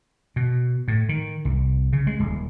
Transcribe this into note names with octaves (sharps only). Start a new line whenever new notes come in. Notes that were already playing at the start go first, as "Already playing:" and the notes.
B2
A2
D#3
C2
C#3
G#3
D#1